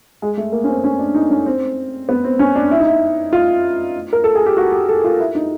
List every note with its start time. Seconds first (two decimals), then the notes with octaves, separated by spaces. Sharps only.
0.22 G#3
0.37 A3
0.52 A#3
0.64 C#4
0.68 C4
0.84 C#4
0.99 D4
1.14 D#4
1.30 C#4
1.46 C4
2.09 B3
2.24 C4
2.39 C#4
2.55 D4
2.71 E4
2.79 D#4
2.87 E4
3.33 F4
4.13 A#4
4.24 A4
4.35 G#4
4.46 G4
4.57 F#4
4.72 G4
4.89 A4
5.04 F4
5.20 E4
5.35 D#4